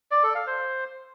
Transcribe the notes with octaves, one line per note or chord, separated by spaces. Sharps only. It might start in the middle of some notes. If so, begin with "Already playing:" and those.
D5
A4
F5
C5